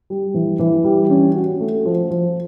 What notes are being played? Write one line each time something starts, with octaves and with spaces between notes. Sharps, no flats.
G3
E3
E3
G3
C#4
F#4
A3
F3
F3